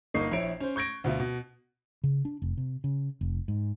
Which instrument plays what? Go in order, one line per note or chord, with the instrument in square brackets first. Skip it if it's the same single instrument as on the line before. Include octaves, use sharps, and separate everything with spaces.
[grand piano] G1 A#3 D#4 D#5 C#6 C7
A#1 E4 C#5 D7
C#4 C5
C#6 G6 G#6 A#6 D7
D2 B2 F4 E5
B2
[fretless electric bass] C#3
D4
F1
C3
C#3
F1
G#2